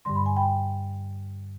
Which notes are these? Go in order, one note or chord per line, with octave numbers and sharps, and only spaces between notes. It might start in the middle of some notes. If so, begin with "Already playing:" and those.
G2 D3 G3 C6
B5
G#5
G5 B5